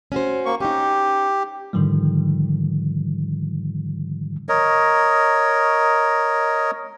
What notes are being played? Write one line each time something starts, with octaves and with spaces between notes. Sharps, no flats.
C#4 F#4 C5
A#3 C#6
C#4 D#4 G4
G#2 D3 D#3 F3 G3
A#4 C#5 D#5